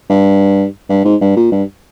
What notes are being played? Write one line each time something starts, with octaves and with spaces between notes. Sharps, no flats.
G2
G2
G#2
G2
A#2
G2